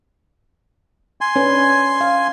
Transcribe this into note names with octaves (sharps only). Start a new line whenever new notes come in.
G#5 C6
C#4 D4 B4
F5